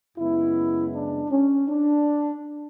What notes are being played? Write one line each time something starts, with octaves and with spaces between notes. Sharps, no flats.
F#2 C#3 G#3 B3 E4
D4
C#4
D4